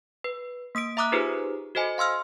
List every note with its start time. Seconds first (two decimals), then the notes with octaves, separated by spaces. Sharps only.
0.24 B4
0.75 A#3 D#6 B6 D7
0.97 E5 A#5 D6 D#6 F#6
1.12 D#4 F4 G4 G#4 B4 C5
1.75 F#4 A4 C5 D#5 G#5
1.98 F5 C6 E6 F6